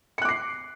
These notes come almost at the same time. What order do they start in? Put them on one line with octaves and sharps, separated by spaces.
C#7 F#6 D6 C7